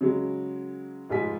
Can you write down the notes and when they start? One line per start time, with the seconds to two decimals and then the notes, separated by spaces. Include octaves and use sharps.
0.01 C#3 F#3 G#3
1.10 F1 G#2 G#3 F4 G#5 B6